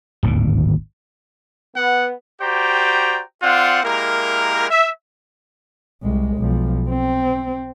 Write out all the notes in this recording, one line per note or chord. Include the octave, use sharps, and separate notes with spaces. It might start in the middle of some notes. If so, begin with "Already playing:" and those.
D1 G#1 D#2 A#2
B3 F#5
F#4 G4 C5 D5 G5 A#5
C4 F4 D5 F#5
G#3 A#3 E4 G4 A#4
E5
C2 G#3
B1 F3
C4